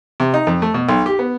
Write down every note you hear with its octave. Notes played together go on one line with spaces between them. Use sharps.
C3
D#4
F2
A3
B2
B1
G4
B3